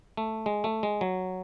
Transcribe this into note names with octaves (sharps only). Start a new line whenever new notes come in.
A3
G#3
A3
G#3
F#3